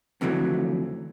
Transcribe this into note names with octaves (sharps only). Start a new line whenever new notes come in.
F2 D3 E3 F#3 A3